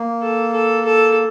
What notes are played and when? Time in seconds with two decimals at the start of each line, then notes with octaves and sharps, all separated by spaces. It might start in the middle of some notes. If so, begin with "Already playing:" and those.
Already playing: A#3
0.22 A4
0.53 A4
0.85 A4